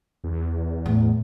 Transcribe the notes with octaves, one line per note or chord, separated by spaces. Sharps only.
E2
A2